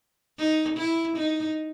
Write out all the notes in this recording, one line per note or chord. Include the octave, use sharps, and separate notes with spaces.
D#4
E4
D#4